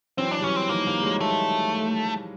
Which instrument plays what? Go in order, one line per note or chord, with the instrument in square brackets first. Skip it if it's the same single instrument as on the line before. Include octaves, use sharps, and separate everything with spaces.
[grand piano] E3 F#3 [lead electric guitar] C4
[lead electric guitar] D4
[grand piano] G3
[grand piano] E3 F#3 [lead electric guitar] C#4
[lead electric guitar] C4
[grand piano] D#3 F3 [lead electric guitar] A#3
[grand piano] F3 G3
G3
F#3 G#3
[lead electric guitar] A3